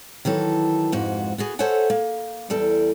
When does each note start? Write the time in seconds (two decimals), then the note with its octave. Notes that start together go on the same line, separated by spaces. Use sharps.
0.25 D#3 E3 F#3 A4
0.92 F2 G#2 F#4
1.38 B3 F#4 G#4
1.59 A4 C5 C#5 E5 F#5 G#5
1.90 A#3
2.50 E2 G3 A4